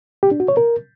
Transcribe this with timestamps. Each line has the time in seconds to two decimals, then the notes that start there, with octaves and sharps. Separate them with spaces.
0.23 G4
0.31 D4
0.40 F#4
0.48 C#5
0.57 A#4